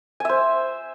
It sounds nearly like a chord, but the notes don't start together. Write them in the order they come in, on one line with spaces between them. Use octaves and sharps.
G#5 E5 C5